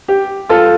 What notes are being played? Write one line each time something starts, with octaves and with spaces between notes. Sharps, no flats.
G4
F4 A4